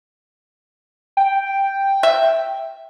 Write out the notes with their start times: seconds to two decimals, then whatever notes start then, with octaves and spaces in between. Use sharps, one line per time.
1.17 G5
2.03 E5